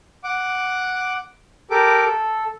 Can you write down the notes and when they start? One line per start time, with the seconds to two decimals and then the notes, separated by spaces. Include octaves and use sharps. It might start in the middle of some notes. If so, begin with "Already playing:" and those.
0.24 F#5 D6
1.71 G4 A4 A#4 D6
2.04 A4